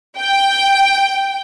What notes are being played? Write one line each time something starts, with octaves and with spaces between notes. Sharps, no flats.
G5